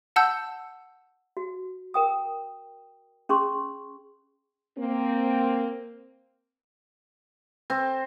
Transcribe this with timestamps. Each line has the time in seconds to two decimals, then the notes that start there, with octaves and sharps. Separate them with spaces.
0.16 F#5 A5 E6 G6
1.37 F#4
1.94 A#4 G5 D#6
3.29 C#4 G#4 C6 C#6
4.78 A#3 C4
7.70 C4